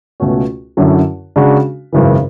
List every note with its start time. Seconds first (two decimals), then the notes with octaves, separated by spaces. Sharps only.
0.20 C#2 B2 A3 C#4 F#4
0.77 F#2 D3 F#3 C#4 E4
1.36 C#3 G#3 D4 F#4
1.93 G#1 F#2 C#3 E3